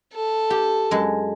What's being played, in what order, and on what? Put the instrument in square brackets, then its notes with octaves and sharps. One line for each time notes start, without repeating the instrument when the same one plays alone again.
[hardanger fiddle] A4
[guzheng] G4
F#2 G#3